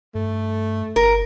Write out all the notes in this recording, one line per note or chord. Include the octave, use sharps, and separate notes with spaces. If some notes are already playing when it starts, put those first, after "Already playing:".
G2 A3
G1 A#4